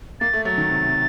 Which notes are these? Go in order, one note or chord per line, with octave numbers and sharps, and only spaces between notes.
A#3 A6
A3
F#3 A6
D#3
C3
C3